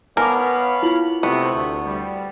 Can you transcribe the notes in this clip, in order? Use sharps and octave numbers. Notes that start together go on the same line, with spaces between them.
B3 A#4 C#5 F5 G#5 A5 B5 D6
E4 F4 F#7
C3 A3 B3 C5 C#6
D2
G3